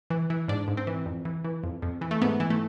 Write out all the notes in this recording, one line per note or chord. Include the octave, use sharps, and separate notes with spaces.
E3
E3
G#2 D4
G#2
C4
E3
F2
E3
E3
F2
F2
E3
A3
G#2 B3
E3
A3